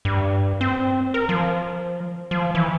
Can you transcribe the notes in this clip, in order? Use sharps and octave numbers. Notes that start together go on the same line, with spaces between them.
G2
C4
A#4
F3
F3
E3